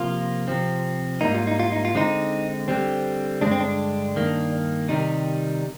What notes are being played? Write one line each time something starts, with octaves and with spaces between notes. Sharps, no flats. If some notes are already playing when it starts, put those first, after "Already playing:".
Already playing: C3 F3 A#3 F4
C3 F3 C4
G#2 G3 A#3 D#4
F4
D#4
F4
D#4
F4
D3 G#3 C4 D#4
D3 G3 C4
G2 D3 G#3 C4 D4
C4
D4
G2 D#3 A#3
C3 D#3 G3 D#4